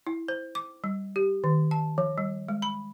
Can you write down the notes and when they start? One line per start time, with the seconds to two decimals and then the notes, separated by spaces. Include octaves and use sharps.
0.07 E4
0.28 C5
0.55 D6
0.84 G3
1.16 G4
1.44 D#3
1.71 A5
1.98 F3
2.18 G3
2.49 G#3
2.62 B5